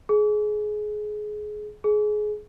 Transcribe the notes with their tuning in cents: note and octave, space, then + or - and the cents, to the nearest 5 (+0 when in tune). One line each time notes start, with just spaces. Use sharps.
G#4 +25
G#4 +25